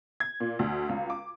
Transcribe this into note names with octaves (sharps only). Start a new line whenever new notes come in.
G#6
A#2
D2
C#2
D6